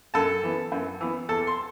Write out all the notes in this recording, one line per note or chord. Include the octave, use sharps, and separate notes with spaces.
F#2 A4 A5
E3 B3
F#2
E3 B3
E2 A4 A5
C6